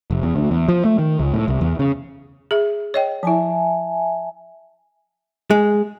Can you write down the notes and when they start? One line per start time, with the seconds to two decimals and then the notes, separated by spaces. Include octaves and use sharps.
0.11 F1
0.23 E2
0.36 D2
0.51 E2
0.69 F3
0.85 A3
0.99 D#3
1.20 C#2
1.34 A2
1.48 C2
1.61 E2
1.79 C#3
2.51 G#4 E5
2.94 C#5 D#5 G5
3.23 F3 E4 E5 G#5 A5
5.51 G#3